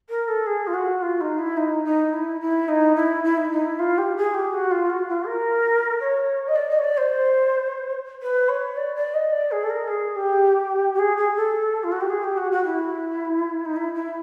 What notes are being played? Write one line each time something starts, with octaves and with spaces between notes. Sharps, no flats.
A#4
A4
G#4
F4
F#4
F4
D#4
E4
D#4
D#4
E4
E4
D#4
E4
E4
D#4
D#4
E4
F4
G4
G#4
G4
F#4
F4
F#4
F4
A#4
C#5
D#5
D5
D#5
C#5
D5
C5
B4
C#5
D5
D5
D#5
D5
G#4
A4
A#4
G#4
G4
G4
G#4
G#4
A4
F4
F#4
G4
G#4
G4
F#4
F#4
E4
D#4
E4
E4